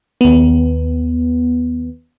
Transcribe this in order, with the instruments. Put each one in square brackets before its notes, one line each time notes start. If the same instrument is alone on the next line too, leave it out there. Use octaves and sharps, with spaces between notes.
[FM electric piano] D#2 B3